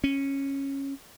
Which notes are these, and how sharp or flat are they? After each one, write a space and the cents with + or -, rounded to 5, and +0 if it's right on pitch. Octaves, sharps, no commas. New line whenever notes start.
C#4 -10